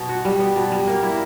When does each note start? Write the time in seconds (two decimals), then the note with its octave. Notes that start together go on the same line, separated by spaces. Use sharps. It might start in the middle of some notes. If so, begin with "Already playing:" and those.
Already playing: B2 F#3 B3
0.09 F#4
0.25 G3
0.39 B3
0.56 B2
0.72 G3
0.87 A#3
1.03 E4